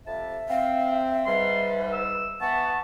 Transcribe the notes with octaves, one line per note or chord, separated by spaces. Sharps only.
F2 C3 E5 A5
C4 F5
G#2 G3 B4 C6
E6
E3 B3 F#5 A5 C#6